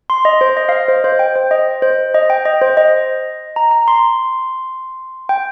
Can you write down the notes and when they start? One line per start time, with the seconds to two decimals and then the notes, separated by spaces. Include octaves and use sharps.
0.10 C6
0.25 D#5
0.41 C5
0.57 D#5
0.69 F5
0.72 D#5
0.88 C5
1.04 C5
1.19 G5
1.36 C5
1.51 D#5
1.82 C5
2.14 D#5
2.30 G5
2.45 D#5
2.61 C5
2.77 D#5
3.56 A#5
3.71 A#5
3.88 C6
5.29 G5